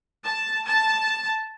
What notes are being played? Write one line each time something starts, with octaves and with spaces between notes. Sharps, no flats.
A5
A5